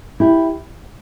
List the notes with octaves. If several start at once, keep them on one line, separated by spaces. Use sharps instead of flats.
E4 G4